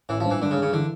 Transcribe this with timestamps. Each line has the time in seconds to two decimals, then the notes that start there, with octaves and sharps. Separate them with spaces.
0.09 A1 E3
0.20 F3
0.25 G2
0.30 E3
0.41 G2 D3
0.51 C#3
0.57 G2
0.62 C#3
0.73 D3 E3